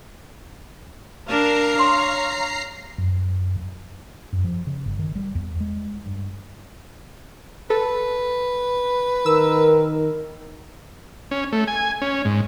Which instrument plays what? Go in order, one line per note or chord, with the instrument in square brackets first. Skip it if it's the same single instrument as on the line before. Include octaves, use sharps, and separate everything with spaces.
[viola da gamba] D4 A#4 [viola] F5 [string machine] A#5 C7
[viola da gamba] C#5 [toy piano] C6
[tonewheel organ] F#2
[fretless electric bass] F#2
F3
C#3
G1
D#3
G3
E2
G#3
G2
[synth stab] A4 [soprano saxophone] B4
[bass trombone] D#3 [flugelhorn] A#4 [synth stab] E6
[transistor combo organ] C#4
A3
G#5
C#4
G#2